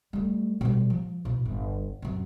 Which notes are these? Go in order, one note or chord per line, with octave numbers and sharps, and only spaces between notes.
G3 A3
B2 G3
F3
B2 E4
G1
F#2 C3